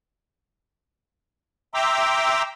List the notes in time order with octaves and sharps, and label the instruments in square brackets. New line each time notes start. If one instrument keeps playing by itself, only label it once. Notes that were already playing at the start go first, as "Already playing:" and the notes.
[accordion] E5 G5 A#5 C6 D6 E6